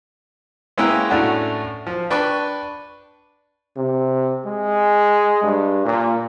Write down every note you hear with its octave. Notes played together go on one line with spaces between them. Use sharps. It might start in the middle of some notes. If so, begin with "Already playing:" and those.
G#3 A#3 B3 C#4 E4 G5
A2 A3 C#4 D4 F#4
F3
D4 B4 G5 A5 C#6 D6
C3
G#3
G2
A#2